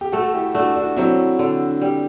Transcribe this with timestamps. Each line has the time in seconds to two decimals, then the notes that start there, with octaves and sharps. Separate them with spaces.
0.01 G4
0.12 A3 F#4 A4
0.23 A4
0.34 E4 G4
0.54 A3 D4 F#4
0.76 D4 F#4
0.97 F#3 C4 E4
1.39 D3
1.82 G3